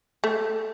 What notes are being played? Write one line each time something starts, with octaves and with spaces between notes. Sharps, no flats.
A3